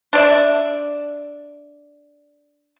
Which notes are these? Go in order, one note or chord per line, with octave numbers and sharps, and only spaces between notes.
D4 D5 E5